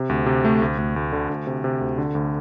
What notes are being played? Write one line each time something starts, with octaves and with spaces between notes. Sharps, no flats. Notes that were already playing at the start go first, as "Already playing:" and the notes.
Already playing: C3
D2
C3
A3
D2
D2
D2
D3
D2
C3
C3
D2
D3
D2